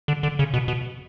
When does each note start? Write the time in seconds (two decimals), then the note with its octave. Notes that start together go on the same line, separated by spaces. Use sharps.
0.08 D3
0.23 D3
0.39 C#3
0.54 B2
0.68 B2